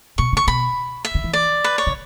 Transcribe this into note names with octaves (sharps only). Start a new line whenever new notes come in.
B2 C#6
C#3
C#6
B2 B5
E5
C#3
E3
D5
B4
C#5
C#3